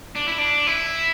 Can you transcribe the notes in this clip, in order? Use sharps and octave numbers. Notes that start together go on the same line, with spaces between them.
D4
E4
D4
E4